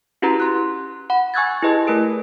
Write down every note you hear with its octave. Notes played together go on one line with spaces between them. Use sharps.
C#4 E4 F#4 G4 B4 A#5
C6 F#6
F#5 B5
G#5 C#6 E6 F#6 G#6 A6
E4 G4 G#4 B4 D#5 A5
A3 A#4 B4 D7